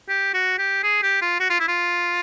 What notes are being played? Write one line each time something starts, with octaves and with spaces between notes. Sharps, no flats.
G4
F#4
G4
G#4
G4
F4
F#4
F4
E4
F4